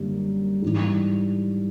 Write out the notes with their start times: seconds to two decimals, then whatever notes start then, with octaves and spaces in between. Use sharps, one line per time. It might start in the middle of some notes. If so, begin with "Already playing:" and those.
Already playing: F#2 D3 G3 A#3
0.62 G#2 E3 G3